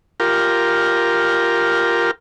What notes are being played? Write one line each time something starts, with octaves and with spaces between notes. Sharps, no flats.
F4 G4 A#4